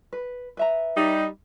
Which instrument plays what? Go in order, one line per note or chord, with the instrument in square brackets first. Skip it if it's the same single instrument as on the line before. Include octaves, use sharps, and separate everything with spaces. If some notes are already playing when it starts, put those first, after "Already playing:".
[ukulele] B4
B4 E5 A#5
[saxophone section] G3 D#4